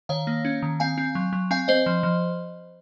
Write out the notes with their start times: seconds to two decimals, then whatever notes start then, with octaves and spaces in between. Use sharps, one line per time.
0.09 D#3 C#5 F5
0.27 A#3
0.45 C#4
0.62 D#3
0.80 C4 F5 G#5
0.98 C4
1.15 F#3
1.33 F#3
1.51 C4 F5 G#5
1.68 C4 C5 D#5
1.86 F3
2.03 F3